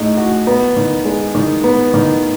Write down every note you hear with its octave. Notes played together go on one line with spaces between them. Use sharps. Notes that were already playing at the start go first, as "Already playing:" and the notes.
Already playing: A2 G#3 D#4
F#4
B3
D#3
G#3
D#3
B3
D#3